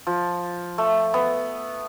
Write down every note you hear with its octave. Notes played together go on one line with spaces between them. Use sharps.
F3
A3
B3